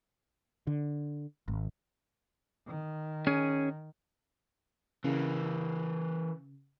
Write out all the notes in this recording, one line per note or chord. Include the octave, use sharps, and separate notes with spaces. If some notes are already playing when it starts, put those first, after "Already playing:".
D3
G#1
D#3
C#4 G#4
C#3 E3 A#3